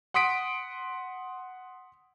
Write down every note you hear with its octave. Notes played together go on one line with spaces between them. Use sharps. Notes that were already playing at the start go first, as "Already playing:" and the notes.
F#5 C6 D#6 B6 D7